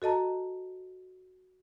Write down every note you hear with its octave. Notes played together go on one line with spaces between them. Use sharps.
F#4 A4 D#5 A5 A#5